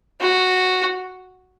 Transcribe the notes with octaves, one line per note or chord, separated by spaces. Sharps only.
F#4